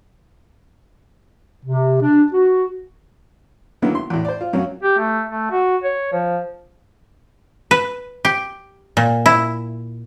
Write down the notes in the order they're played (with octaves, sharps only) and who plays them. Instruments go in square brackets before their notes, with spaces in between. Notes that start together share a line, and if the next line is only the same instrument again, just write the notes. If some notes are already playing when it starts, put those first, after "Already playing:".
[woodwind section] C3
D4
F#4
[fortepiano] D3 D#3 F#3 A#3 B3 E4
C6
E2 A2
C5 D5
F4
F#2 C#4 F#4 F5
[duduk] G4
A3
A3
F#4
C#5
F3
[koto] B4
G4
A#2
E4